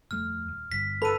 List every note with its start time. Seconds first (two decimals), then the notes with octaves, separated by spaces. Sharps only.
0.11 D#1 F2 A3 F6
0.48 D#1
0.72 G1 B6
1.02 A4 B4 B5 D#7